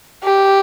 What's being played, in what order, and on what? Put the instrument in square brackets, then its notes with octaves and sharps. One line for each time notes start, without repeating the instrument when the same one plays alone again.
[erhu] G4